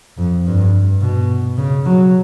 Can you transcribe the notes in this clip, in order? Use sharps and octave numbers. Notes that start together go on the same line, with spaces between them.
F2
G2
B2
C#3
F#3